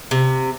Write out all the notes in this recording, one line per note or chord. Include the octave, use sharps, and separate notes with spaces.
C3